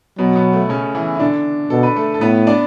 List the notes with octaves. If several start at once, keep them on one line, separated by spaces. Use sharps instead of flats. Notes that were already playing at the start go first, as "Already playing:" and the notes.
B2 F#3 B3
B2 B3
A3
C#3 C#4
E3 E4
E4
D3 D4
B2 A4
B4
A3 A4
A4
A2 B3 B4
D4 D5